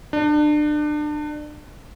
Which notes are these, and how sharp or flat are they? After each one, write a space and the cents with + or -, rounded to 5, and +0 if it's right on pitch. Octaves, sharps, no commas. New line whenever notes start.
D4 +30